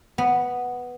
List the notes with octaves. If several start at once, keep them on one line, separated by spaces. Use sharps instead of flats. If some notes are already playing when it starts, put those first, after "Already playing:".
B3